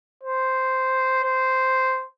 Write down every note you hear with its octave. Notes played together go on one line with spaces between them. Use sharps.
C5
C5